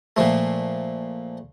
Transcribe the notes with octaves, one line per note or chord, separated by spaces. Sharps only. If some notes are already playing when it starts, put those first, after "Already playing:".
A#2 F3 A3